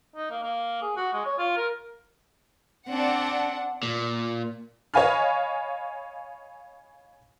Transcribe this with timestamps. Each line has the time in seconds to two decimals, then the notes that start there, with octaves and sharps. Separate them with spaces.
0.16 D#4
0.31 A#3
0.43 A#3
0.82 G#4
0.97 F#4
1.13 G#3
1.25 C#5
1.39 F4
1.57 A#4
2.89 C4 D4 F#5
3.83 A#2
4.94 C#5 D#5 F5 G#5 B5 F6